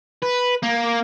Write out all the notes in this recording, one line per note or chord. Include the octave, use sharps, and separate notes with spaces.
B4
A#3